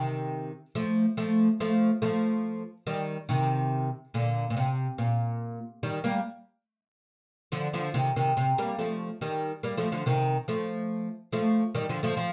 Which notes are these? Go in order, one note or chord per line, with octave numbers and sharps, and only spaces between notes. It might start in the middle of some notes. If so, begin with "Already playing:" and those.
Already playing: C3 D#3
F3 A3
F3 A3
F3 A3
F3 A3
D#3 G3
C3 D#3
A#2 D3
A#2
C3
A#2
D#3 G3
G3 A#3
D3 F3
D3 F3
C3 D#3
C3 D#3
C3
G3 A#3
F3 A3
D#3 G3
G3 A#3
F3 A3
D3 F3
C3 D#3
F3 A3
F3 A3
D#3 G3
D3 F3
F3 A3
F3